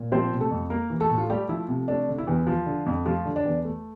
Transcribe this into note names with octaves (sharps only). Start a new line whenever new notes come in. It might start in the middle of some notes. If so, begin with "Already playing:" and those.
Already playing: A#2
F3 C4 C5
C3
A3 A4
F2
A#3 A#4
E3
A3 A4
A2
F4
G3 A3 G4
F3 E4
C3
A3 D4
D3
E4
E2
F3 F4
D3
F2
F3 A3 F4
D3
D4
E2
A3